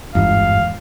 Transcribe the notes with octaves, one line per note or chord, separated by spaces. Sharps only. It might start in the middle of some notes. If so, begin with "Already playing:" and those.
G1 E2 G#2 F5